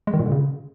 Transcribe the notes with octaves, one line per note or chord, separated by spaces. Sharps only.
G#3
D#3
A#2
D3
C#3